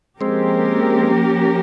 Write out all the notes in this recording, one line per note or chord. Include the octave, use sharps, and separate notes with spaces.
F3 G#3 A#3 C4 C#4 G4 A#4